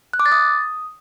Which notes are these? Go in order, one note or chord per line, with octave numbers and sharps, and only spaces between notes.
F#6
D6
A6
D#6